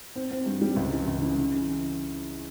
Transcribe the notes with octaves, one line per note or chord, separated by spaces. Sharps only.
C4
C4
G2
G3
C#2
E3
C#2
C#3
C#3
E3